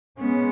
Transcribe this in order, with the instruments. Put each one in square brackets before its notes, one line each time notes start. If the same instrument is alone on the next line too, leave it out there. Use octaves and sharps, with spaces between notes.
[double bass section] G#3 C#4 [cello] B3